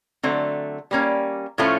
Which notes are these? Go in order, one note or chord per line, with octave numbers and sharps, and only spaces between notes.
D3 F#3 A3 C4
G3 A#3 C#4
A2 F3 A3 C#4